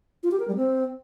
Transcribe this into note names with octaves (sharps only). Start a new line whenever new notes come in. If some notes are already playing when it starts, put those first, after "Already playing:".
F4
G4
A#4
G3
C4